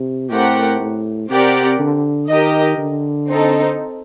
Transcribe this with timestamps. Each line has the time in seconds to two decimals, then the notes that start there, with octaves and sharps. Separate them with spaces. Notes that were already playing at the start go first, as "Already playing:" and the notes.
Already playing: C3
0.31 A2 A3 C4 G4 A#4 F#5
0.80 A2
1.30 C3 C4 G4 A#4 D5 F#5
1.79 D3
2.28 D#3 G4 A#4 D#5
2.78 D3
3.27 C4 D#4 A4